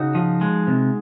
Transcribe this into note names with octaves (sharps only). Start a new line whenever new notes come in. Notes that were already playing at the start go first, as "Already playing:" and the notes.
Already playing: C#3 D#4 F#4
F3
G#3
C3